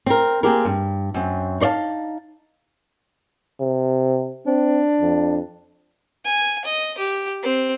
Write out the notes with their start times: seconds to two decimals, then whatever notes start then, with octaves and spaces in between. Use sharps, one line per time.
0.06 C4 A#4
0.43 A#3 C4 C#4 G4 G#4 A#4
0.65 G2
1.14 F#2 C4
1.60 D#4 C5 D5 F5 A5
3.60 C3
4.46 C4 D4
5.01 F2
6.25 G#5
6.65 D#5
6.98 G4
7.43 C4